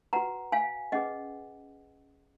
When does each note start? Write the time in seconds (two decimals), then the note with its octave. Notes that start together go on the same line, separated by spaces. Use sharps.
0.13 F#4 B4 F#5 A#5
0.52 F5 G#5
0.92 C#4 G#4 B4 D#5 F#5